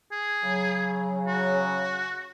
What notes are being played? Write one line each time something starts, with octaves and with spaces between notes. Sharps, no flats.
G#4
C#3 F#3
F#4